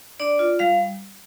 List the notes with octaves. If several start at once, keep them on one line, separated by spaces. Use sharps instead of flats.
D4 D5
F4
G3 F5